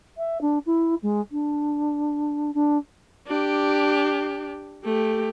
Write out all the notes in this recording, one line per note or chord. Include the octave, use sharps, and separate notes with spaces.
E5
D4
E4
G#3
D4
D4
D4 G4
A3 G4